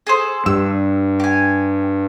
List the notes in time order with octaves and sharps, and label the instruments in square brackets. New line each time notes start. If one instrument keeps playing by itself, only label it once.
[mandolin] G#4 A4 C5
[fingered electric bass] G2 [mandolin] E6
[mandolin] G4 G#5